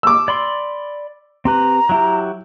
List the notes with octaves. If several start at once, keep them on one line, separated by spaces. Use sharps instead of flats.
D6 E6
D5 B5 C6
C4 G4 B4 A#5
F#3 E4 G4